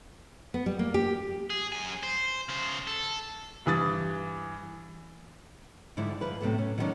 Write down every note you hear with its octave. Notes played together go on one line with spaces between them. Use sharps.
B3
G3
A#3
G4
G#4
F#2 G#5
C5
C#3 C5
A4
G2 E3 D#6 A6
G#2 D3 F3 G3 E4
F3 B4
A2 C3 F#3 A3 B3
C#4
D#3 F#3 G3 A#3 C#4 D4